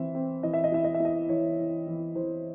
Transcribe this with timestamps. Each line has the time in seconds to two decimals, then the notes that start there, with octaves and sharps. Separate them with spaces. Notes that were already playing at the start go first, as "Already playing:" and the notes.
Already playing: E3 C4 E5
0.15 C4
0.43 E3 D#5
0.53 E5
0.64 D#5
0.72 E4 E5
0.84 D#5
0.94 E5
1.00 E4 D#5
1.29 E3 C#5
1.58 E3
1.87 E3
2.15 E3 C5